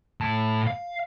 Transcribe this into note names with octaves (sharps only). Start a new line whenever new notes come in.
A2 A5
F5